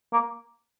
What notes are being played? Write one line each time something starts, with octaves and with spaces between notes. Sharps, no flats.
A#3